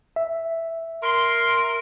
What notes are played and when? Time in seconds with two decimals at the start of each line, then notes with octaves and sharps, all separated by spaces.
0.16 E5
1.03 A#4 C6